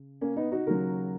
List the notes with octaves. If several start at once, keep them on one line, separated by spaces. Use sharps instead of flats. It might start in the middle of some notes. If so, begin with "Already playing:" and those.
Already playing: C#3
A#3 C#4
B3 D#4
D#4 F#4
D#2 C#3 F#3 F#4 A#4